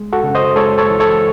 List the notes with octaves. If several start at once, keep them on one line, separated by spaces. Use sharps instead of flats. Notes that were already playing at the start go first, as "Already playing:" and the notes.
Already playing: G#3
F#4 A4
C#3
C5 D#5
G#3 A4 C#5
A4 C#5
E3
A4 C#5